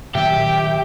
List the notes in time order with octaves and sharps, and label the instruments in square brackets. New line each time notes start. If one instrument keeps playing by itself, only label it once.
[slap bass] A#2 D#3 F#3 [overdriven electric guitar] G4 [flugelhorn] E5 [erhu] G5